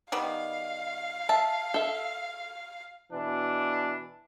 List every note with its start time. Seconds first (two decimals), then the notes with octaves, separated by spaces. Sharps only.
0.12 D#3 G3 B3 F5
1.29 E5 A5
1.74 A4 E5
3.12 B2 E3 D4